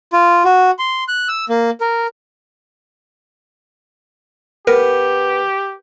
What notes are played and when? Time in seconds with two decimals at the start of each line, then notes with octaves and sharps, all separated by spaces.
0.13 F4
0.44 F#4
0.79 C6
1.08 F#6
1.28 E6
1.49 A#3
1.81 A#4
4.67 B3 G4 A#4